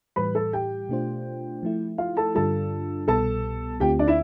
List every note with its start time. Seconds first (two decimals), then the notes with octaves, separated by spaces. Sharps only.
0.16 A2 E3 G3 B4 B5
0.35 A4 A5
0.53 G4 G5
0.89 B2 A3 D4 F4 C5
1.63 F3 A3 E4
1.98 F4 F5
2.17 A4 A5
2.35 G2 D3 G3 D4 F4 A4 A5
3.08 C2 B2 G3 B3 A4 A5
3.80 D2 D3 A3 C4 F4 G4 G5
3.99 D4 D5
4.08 E4 E5